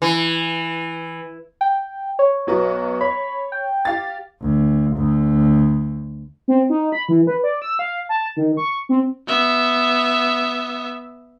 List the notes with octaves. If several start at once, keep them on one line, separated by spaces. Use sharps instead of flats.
E3
G5
C#5
B1 F#3 B3
C#5 B5
G5
G4 F5 A6
D2
D2
C4
D#4
B5
E3
B4
D5
E6
F5
A5
D#3
C#6
C4
B3 E5